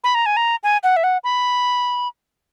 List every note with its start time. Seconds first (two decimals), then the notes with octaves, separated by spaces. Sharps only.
0.04 B5
0.15 A#5
0.26 G#5
0.37 A#5
0.63 G#5
0.83 F#5
0.96 E5
1.04 F#5
1.24 B5